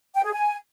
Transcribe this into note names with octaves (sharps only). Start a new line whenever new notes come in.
G5
G#4
G#5